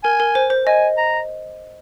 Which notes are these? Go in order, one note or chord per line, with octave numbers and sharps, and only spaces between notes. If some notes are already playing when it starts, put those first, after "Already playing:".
A#4 G#5
A#4
C5
C5
D#5 G#5
A#5